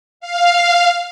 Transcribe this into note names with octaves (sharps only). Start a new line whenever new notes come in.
F5